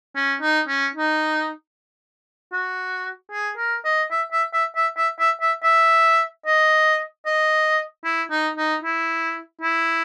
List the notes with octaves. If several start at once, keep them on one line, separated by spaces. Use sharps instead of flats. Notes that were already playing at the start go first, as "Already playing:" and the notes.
C#4
D#4
C#4
D#4
F#4
G#4
A#4
D#5
E5
E5
E5
E5
E5
E5
E5
E5
D#5
D#5
E4
D#4
D#4
E4
E4